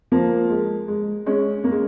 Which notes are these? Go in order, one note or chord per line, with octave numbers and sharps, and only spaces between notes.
F3 A#3
G#3
G#3
G#3 C#4
A#3
G#3